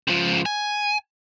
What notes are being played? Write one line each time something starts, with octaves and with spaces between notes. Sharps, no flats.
C#2 F3
G#5